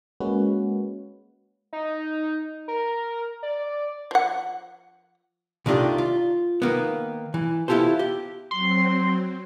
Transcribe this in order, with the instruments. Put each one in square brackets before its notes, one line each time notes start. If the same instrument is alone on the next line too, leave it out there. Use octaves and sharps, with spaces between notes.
[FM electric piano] G#3 A#3 C#4 F#4 B4
[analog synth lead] D#4
A#4
D5
[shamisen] F3 F#5
[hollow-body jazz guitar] C2 D#3 A3 D4 F4 G4
F4
D#3 A#3 B3
E3
B3 E4 F4 G4 A4 C5
G4
[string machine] F#3 C4 [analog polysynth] C6